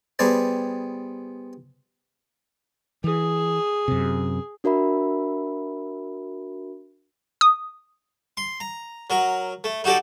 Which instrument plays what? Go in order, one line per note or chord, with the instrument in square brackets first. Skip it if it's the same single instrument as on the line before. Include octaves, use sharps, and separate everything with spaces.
[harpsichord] G3 B3 G4 G#4 C5 A5
[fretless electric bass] E3 [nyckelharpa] G#4
[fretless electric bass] F#2 C3
[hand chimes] D4 F#4 A#4 E5 B5
[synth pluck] D#6
[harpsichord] C6
A#5
F#3 A#4
A3
D#4 F#4 G4 A4 D5